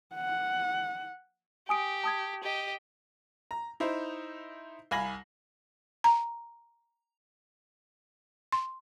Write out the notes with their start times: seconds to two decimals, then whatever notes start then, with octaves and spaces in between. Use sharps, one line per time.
0.15 F#5
1.69 G4 G#5 D#6 D7
2.04 A5 D#6 G#6
2.44 G4 D#5
3.51 A#5
3.80 D#4 E4 C5
4.91 C2 F5 G#5 B5 A#6 F#7
6.04 A#5
8.52 C6